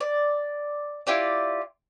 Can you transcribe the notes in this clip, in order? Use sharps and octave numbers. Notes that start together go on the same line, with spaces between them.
D5
E4 F4 G4 D5